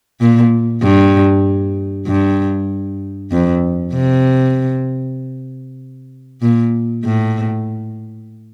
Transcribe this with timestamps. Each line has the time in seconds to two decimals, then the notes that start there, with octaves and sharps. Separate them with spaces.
0.21 A#2
0.83 G2
2.07 G2
3.32 F2
3.94 C3
6.42 A#2
7.05 A2